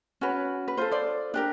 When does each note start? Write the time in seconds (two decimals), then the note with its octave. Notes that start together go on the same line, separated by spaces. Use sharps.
0.21 C#4 F#4 B4
0.68 B4
0.77 F4 A4 C5
0.91 C5 D5
1.34 D4 G4 A#4